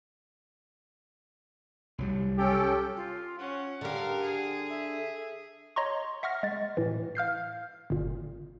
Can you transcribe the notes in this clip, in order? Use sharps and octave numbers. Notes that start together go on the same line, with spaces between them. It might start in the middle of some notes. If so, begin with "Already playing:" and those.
C2 F#3 G3
C#4 G4 A4 G5
F4
C#4 F#5
D3 G4 A#4 F5
G#4
E5
C#5 D#5 A#5 C6 C#6
E5 F#5 C#6 F6 A#6
G#3 A6
A2 E3
F5 F6 G6 C7
G1 A#2